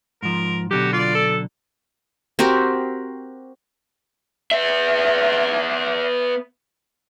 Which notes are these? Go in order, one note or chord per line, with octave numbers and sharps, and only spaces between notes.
G#2 F3 A#4
B2 D3 F#3 F#4 G4
F4 D5
A4
C4 F#4 G4 A#4
B3 E5